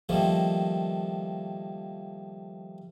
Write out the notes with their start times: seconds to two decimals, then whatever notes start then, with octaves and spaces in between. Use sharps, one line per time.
0.09 D#3 F3 G3 A3 A#3